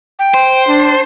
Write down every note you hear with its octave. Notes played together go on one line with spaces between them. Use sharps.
G5
C5
D4